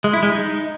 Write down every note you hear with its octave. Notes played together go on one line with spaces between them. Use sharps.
G#3
E4
G#3
D#4